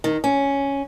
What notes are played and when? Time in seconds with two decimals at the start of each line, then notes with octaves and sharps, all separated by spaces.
0.04 D#3
0.24 C#4